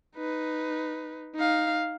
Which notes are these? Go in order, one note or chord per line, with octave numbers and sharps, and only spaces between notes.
D#4 B4
D#4 F5